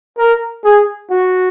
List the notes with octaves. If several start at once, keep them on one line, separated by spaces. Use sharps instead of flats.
A#4
G#4
F#4